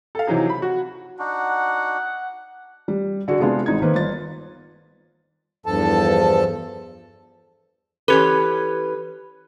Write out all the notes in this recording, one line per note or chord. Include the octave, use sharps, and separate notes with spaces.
A4 F5
C3 E3 F#3 D#4 G#4
B5
F#4
D4 D#4 F#4 F#5
G3
D3 F#4 G#4
C3 G#3 B3 D4 F4 G#4
G#1 D#4 G#6
D#3 A#3 B4 C5
G1 F4 A6
E2 G2 F3 A4 A5
E3 C#4 G4 A4 B4